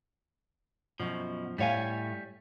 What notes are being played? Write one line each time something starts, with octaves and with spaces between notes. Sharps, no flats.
F#2 B2 F3
A2 G3 C#5 F5 G#5